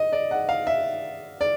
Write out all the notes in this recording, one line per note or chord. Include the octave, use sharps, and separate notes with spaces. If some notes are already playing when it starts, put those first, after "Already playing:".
Already playing: D#5
D5
F#5
F5
E5
D5